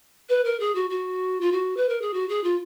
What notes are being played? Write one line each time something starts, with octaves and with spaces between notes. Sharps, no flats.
B4
A#4
G#4
F#4
F#4
F4
F#4
B4
A#4
G#4
F#4
G#4
F4